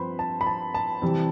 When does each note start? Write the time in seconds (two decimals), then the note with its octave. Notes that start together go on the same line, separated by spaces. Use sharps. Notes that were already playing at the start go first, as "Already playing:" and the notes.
Already playing: G2 F3 C4 B4 C5 B5
0.19 A5
0.41 B5
0.47 A5
0.75 A5
1.02 C3 E3 G3 C4